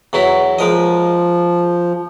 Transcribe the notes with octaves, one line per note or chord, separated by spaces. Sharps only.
E2 F#3 E4
F3 G#3 A#4 D#5